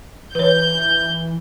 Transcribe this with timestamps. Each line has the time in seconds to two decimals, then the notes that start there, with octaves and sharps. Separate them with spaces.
0.35 E3 B4 C#5 G6